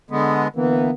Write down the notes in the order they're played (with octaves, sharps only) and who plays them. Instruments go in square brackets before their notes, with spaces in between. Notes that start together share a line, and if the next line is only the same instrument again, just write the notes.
[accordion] D3 G#3 B3
[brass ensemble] D3 A#3 B3 [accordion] E3